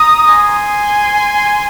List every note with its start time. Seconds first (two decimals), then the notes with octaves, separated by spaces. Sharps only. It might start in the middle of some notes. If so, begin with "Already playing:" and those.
Already playing: A#5 D#6
0.28 G#5 C6